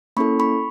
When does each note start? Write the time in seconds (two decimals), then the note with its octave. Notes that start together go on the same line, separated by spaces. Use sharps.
0.17 A#3 C#4 E4 A4 B5 C#6
0.40 B5 C#6